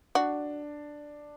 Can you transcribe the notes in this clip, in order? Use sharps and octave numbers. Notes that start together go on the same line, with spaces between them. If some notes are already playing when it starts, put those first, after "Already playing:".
D4 F#4